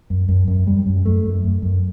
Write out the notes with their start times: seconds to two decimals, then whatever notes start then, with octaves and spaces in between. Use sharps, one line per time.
0.10 F#2
0.29 F#2
0.48 F#2
0.67 F#2 G3
0.86 F#2
1.06 F#2 A3
1.24 F#2
1.44 F#2
1.62 F#2